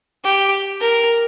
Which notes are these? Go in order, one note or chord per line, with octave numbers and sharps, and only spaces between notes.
G4
A#4